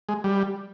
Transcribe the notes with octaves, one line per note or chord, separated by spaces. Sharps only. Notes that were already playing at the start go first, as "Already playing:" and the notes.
G#3
G3